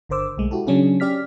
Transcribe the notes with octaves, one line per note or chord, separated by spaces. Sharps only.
G1 D3 A#4 C5 D6 E6
B1 G#3 A3
E4 F#4 G4 A4
C#3 F#3 C#4 D4 G#4
C#4 G4 D5 F6 B6